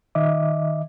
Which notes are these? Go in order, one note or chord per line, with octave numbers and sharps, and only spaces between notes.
D#3 D#5 E5 D6